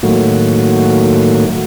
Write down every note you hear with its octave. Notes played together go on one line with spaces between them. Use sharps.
A2 D#3 F#3 A3 A#3 F#4